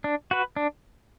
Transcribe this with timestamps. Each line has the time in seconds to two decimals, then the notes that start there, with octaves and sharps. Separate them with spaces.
0.04 D4
0.31 F#4 B4
0.57 D4